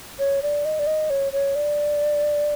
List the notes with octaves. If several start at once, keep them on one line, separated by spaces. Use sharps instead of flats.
C#5
D5
D#5
D5
D#5
C#5
C#5
D5